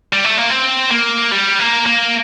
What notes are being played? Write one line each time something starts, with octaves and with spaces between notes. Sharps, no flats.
G3
A3
A#3
C4
A#3
G3
A#3
A#3